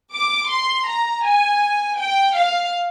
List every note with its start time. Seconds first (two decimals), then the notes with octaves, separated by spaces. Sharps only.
0.14 D6
0.50 C6
0.88 A#5
1.25 G#5
1.99 G5
2.36 F5